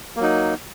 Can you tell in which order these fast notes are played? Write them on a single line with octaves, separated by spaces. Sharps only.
A#3 F#3 D#4